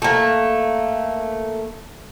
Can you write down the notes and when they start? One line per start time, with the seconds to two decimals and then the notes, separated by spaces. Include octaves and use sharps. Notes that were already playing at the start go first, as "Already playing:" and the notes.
0.02 A3 A#3